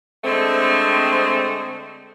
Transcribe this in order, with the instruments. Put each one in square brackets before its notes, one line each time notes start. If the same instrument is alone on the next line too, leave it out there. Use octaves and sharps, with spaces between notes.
[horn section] D3 G#3 A3 C4